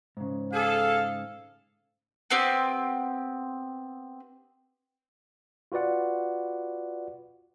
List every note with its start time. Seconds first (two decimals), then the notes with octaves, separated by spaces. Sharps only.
0.17 G#2 C#3
0.53 G#4 A4 F5
2.30 B3 C4 G4
5.72 F4 F#4 B4 D5 F#5